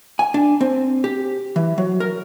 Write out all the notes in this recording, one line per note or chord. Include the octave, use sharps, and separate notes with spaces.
G#5
D4
C4
G4
E3
F#3
A#4